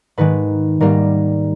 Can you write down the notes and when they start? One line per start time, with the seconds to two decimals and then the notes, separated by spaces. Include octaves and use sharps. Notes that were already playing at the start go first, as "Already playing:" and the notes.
0.17 G#2 D#3 G#3 B4
0.81 G#2 D#3 G3 A#3 A#4